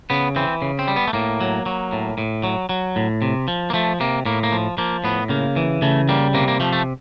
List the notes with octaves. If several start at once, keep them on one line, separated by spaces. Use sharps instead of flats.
C#3 B3
E3 C4
C#3
C4
G3
B3
A3
A2 A#3
F#3
F#3
A2
A2
F#3
F#3
A2
C3
F3
A#3
F3 A3
C3 A#3
A2 A#3
A#3
F3
F3 A#3
A2 B3
C#3 A#3
E3
C#3 A3
G3 A#3
C3 A#3
A#3
F3 A3
A3